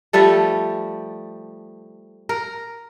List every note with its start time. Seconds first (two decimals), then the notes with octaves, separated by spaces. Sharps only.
0.13 F3 G3 A3 A4
2.29 A#4